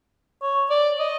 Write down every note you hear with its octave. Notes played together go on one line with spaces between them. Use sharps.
C#5
D5
D#5